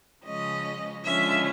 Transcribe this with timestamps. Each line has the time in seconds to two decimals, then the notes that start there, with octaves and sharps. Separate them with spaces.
0.25 C#3 F3 G#3 C#4 D#5
1.04 D3 F3 G#3 C#4 E5